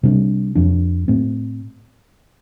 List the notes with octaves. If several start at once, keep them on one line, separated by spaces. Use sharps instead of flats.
C3 G3 D4
F2 F3 D4
A2 A3 C4